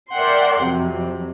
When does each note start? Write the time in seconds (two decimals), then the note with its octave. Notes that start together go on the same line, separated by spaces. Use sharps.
0.13 A#4 D5 E5 F#5 G5 C6
0.64 F2 C3 F#3